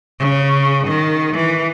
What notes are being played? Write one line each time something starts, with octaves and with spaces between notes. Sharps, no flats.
C#3
D#3
E3